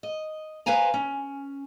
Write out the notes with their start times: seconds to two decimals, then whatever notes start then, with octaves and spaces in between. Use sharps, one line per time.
0.03 D#5
0.66 B4 C5 F5 G#5 A#5
0.94 C#4